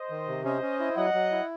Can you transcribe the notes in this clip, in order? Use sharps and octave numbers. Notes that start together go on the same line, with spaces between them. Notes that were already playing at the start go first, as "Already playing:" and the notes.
Already playing: C5 D#5
D#3
C3
C#4 C5 D#5
C#4
E4
F#3 D#5 F#5
F#3
E4